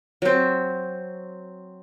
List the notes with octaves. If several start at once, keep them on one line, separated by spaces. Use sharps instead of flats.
F#3 C4